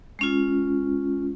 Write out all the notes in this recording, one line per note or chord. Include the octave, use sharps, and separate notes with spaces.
G#3 C#4 F4